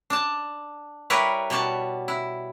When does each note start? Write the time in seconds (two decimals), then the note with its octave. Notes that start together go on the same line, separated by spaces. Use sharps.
0.10 D4 A5
1.10 G3 E4 G4 A#4 B4 C#5
1.50 B2 G3 C#5 A5
2.08 E4